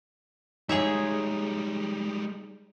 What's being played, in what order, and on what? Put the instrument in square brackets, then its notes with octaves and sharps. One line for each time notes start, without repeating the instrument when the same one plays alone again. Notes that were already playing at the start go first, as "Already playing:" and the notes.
[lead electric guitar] G3 G#3 [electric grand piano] D#4 [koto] G#4 C#5 E5